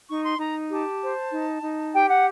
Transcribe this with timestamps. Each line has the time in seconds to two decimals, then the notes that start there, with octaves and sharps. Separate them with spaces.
0.08 D#4 C#6
0.23 C6
0.39 D#4 A#5
0.70 G4 A5
1.02 C5
1.31 D#4
1.63 D#4
1.93 G4 G5
2.09 F#5